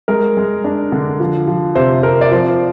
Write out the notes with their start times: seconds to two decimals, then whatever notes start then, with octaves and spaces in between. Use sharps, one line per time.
0.08 G#3 A#4
0.37 G#3
0.64 D4
0.92 D3
1.20 F3
1.47 F3
1.75 C3 C5
2.03 C4 A#4
2.21 D5
2.31 F3 C5
2.50 C5